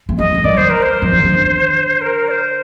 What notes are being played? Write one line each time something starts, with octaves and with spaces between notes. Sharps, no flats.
A3
G3 D#5
D3
D#3 D5
C5
A#4
C5
F3
D#3
D3
A#4
D5
C5